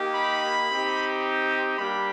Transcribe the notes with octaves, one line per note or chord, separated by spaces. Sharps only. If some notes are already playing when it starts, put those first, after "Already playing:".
Already playing: A#3 D#4 G4
B5
C4 D#4 G4
G3 A#3 D4 G4 B5